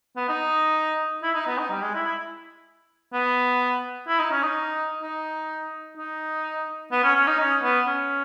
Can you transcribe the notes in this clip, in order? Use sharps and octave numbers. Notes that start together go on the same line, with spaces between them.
B3
D#4
E4
D#4
B3
D#4
G3
G#3
E4
E4
B3
E4
D#4
C#4
D#4
D#4
D#4
B3
C#4
C#4
D#4
C#4
B3
C#4